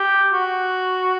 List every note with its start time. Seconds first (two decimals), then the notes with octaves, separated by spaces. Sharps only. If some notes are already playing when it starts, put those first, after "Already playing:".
Already playing: G4
0.33 F#4